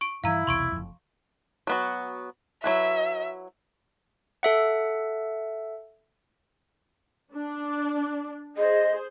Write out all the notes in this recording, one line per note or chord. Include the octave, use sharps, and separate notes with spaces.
C#6 D7
G2 D#3 E3 E4 F5 A#5
B1 E2 C3 C6 C#6 D7
F1 F2
F#3 B3 F#4
F#3 E4 B4 E5
A4 E5 F#5
D4
G#4 C5 D#5